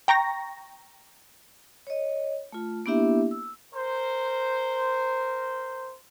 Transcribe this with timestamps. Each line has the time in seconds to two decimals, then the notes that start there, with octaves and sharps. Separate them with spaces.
0.08 G5 A#5 C#6 A#6
1.87 C#5 D#5
2.52 A3 F4
2.86 A#3 B3 D4 E4 G4 E5
3.31 E6
3.74 A#4 C5